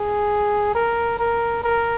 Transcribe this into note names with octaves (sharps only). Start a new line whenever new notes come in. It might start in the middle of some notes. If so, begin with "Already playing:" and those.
Already playing: G#4
A#4
A#4
A#4